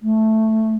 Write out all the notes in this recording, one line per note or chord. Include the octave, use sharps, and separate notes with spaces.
A3